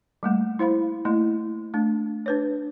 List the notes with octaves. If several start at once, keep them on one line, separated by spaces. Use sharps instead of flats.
G3 A3 A#3
E4 C5 F5 B5
A3 A#3 E4 D#5
A3 D4
D4 B4 C#5